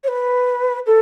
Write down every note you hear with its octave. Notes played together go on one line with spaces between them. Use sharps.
C#5
B4
A4